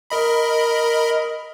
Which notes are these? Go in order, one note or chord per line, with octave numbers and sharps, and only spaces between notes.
A#4 D#5 B5